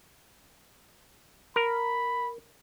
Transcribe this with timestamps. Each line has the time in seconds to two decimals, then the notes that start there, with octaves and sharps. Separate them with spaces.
1.56 A#4 B5